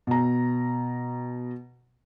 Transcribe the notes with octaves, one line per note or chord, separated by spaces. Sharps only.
B2 A#5